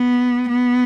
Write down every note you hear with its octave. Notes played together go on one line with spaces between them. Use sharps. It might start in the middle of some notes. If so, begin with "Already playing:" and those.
Already playing: B3
B3